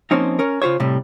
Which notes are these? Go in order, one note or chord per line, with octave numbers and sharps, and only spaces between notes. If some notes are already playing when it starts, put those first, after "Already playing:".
F3 A#3 C4 C#4 D#4
C#4 A#4
C#3 F4 G#4 C5 C#5
A2 C3 G3